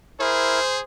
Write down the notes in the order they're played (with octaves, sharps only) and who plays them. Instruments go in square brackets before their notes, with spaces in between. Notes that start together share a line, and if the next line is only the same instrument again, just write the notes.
[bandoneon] E4 A#4 [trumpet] G#4 [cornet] C5